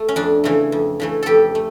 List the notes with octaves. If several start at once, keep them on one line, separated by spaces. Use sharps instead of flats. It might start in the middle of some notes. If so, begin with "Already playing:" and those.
Already playing: A3
C#4
F2 D4
C#3 E3 A3
F2
C#3 E3 A3
F2 G4 A4
A3